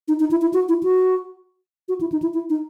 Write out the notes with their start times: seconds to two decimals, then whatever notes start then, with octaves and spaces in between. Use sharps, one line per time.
0.08 D#4
0.20 D#4
0.31 E4
0.42 E4
0.53 F#4
0.69 E4
0.83 F#4
1.89 F#4
2.01 E4
2.12 D#4
2.22 E4
2.34 E4
2.50 D#4